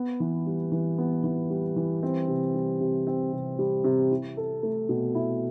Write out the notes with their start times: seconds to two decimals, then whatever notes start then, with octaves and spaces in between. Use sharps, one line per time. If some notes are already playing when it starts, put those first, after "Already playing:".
Already playing: B3
0.20 E3
0.46 G3
0.72 E3
0.98 B3
1.24 E3
1.50 G3
1.76 E3
2.03 C4
2.28 C3
2.55 G3
2.80 C3
3.07 C4
3.32 C3
3.59 G3
3.84 C3
4.11 E4
4.37 A4
4.63 A3
4.89 B2
5.15 E4